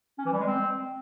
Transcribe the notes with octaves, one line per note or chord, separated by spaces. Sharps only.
C#4
E3
G3
G#3
C4